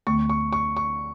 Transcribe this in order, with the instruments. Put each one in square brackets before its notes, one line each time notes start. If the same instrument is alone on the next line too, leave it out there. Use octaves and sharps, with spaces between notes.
[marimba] D2 D3 A3 [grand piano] C#6
[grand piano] C#6
C#6
C#6